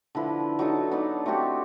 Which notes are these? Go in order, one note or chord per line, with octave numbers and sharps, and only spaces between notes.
D3 F3 E4 B4
F#3 D#4 A4
B3 D4 D#4
A3 C4 F#4 G4